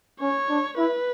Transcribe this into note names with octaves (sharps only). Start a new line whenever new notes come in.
C#4 C#5
D4
E4 B4